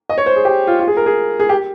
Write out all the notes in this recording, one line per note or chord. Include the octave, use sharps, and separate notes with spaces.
D#5
C#5
C5
G#4
G4
F4
F4
G#4
A#4
G#4
G#4
G4